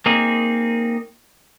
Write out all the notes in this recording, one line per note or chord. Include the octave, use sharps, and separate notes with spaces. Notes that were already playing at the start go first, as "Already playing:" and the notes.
A#3 C4 D#4 G#4